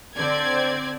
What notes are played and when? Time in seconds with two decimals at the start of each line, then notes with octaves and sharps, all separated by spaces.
0.16 D3 C4 D5 G#6